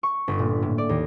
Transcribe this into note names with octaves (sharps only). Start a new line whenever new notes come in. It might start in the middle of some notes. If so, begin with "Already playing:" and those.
C#6
G1
A#2
A2
D5
D#2